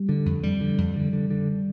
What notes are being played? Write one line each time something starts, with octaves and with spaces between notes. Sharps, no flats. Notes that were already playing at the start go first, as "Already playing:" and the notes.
Already playing: G3
D3
F2
F2 G3
D3
F2
D3
D3
D3